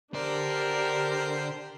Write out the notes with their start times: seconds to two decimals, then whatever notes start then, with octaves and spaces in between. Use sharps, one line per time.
0.14 D3 D4 G4 A#4 C5 D5